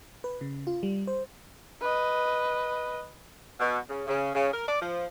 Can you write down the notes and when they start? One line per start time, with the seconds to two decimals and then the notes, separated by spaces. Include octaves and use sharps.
0.24 B4
0.41 C#3
0.67 F4
0.83 G3
1.07 C5
1.81 B4 D#5
3.59 B2
3.89 C#3
4.07 C#3
4.35 C#3
4.53 A#4
4.67 D5
4.80 F3